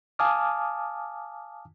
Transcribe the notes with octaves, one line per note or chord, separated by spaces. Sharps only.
F5 G#5 A5 D6 D#6 F6